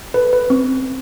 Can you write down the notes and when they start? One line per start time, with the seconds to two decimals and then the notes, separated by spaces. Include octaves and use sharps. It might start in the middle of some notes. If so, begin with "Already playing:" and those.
0.14 A4 B4
0.33 B4
0.50 C4